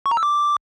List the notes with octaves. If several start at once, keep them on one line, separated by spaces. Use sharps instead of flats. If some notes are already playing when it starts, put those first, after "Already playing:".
C#6
A#5
E6
D6